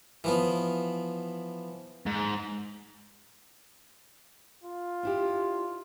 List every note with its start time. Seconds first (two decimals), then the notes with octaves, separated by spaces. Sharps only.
0.24 E3 F3 B3
2.07 G#2
4.64 F4
5.03 D4 E4 G4